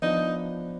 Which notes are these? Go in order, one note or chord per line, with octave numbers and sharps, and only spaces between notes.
F3 B3 D4 D#4